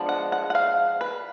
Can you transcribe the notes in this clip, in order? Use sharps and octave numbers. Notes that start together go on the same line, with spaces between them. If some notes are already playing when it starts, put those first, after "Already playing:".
Already playing: F3 G#3 B3 D4
F#5
F#5
F#5
F5
B4